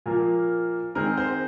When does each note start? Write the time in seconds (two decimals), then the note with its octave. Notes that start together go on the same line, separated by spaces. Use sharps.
0.06 A#2 F3 A#3 A#4
0.95 D#3 G#3 C4 A#4
1.17 C5